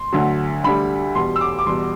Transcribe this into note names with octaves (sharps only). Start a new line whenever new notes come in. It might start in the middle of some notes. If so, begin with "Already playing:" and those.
Already playing: C6
D2 D3 F#3
D2 D3 G3 B5
E2 B2 G3 C6
E6
D6
D6
E2 B2 G3 C6